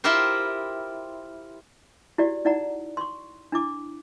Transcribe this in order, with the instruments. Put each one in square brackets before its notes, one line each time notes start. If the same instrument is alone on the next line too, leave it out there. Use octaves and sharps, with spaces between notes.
[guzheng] E4 F4 G4 A#4 C5
[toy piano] E4 F#4 G4 D5
D#4 E4 D5 F#5 A#5
C6 C#6
D4 E4 D6